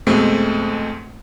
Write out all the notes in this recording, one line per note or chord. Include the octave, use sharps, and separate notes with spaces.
F2 B2 G#3 A3 C4